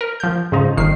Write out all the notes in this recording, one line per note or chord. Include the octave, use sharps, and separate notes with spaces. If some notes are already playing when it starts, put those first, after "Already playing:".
A#4
F3 G6
G#2 C#3 F3 D#4
G1 D#3 C7